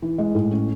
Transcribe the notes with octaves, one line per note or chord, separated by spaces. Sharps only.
E3
G#3
A2
C#4